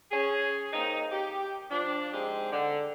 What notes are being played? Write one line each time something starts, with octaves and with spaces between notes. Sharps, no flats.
C#4 G#4
A#3 C4 D#4
G4
F3 D4
G#3 C4 D#4 G4 G#4
D3